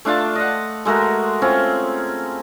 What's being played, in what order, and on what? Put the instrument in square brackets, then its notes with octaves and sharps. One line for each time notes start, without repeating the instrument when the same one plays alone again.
[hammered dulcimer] A3 D4 F4 A5
D#5 F#5
G#3 A3 F#4 A#4
C4 C#4 F4